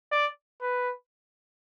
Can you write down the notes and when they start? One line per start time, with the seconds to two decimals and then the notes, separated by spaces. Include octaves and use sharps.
0.11 D5
0.61 B4